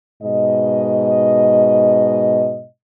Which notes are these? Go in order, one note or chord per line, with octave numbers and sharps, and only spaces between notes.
G#2 B2 D#5